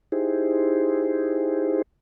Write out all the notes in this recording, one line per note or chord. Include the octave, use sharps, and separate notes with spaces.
D#4 E4 G4 G#4 C5